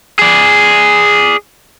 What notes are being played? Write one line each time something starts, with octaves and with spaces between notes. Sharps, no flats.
G#4 D5